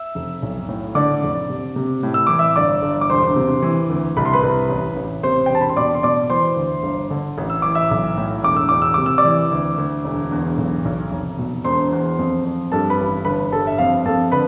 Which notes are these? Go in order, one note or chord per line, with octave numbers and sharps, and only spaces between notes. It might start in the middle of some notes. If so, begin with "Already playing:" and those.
Already playing: E5 E6
F1
B1
A2
D3 D5 D6
F1
C3
C3
A2
E6
E3 D6
E5 E6
G1 D5 D6
G1
D6
E1 C5 C6
C3
E3
D2
C2 B5
C6
B4 B5
C2
A1
A1
C3 C5 C6
G5
E1
A5
B5
C6
B2 D5 D6
C6
B2 D5 D6
E3 C5 C6
D2
G1
D3
A1
E6
E3 D6
E5 E6
B1
A2
E1 D6
E6
E1 D6
E6
C3 D6
E6
D5 D6
E3
D2
D2
E1
E2
B1
B1
F1
B2
E1 C5 C6
E2
F2
F2
G2 A4 A5
B4 B5
A1
G1 B4 B5
G2 A4 A5
E5
F2 F5
F2 A4 A5
D3 B4 B5